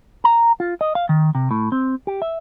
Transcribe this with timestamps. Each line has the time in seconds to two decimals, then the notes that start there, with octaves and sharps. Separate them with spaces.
0.24 A#5
0.60 F4
0.81 D#5
0.95 F5
1.09 D#3
1.35 C3
1.51 A2
1.72 C4
2.07 G4
2.22 E5